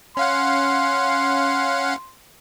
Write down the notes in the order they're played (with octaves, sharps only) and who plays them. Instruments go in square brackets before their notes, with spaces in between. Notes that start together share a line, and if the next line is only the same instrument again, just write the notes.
[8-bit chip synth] C#4 F5 F#5 [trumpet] C6